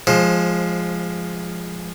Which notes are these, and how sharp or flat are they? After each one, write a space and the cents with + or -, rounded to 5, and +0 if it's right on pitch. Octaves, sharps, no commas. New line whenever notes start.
F3 +0 G#3 +0 C5 +25